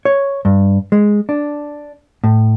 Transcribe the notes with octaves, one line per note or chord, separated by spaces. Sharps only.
C#5
G2
G#3
D4
A2